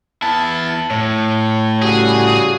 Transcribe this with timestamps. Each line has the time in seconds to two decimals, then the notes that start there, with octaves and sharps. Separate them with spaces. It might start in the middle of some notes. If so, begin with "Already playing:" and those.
0.22 B3 E4 A5
0.91 A2 C#5
1.82 C#3 G3 F#4 G#4